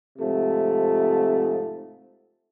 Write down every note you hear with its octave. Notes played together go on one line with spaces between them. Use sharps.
G#2 C3 F3 A3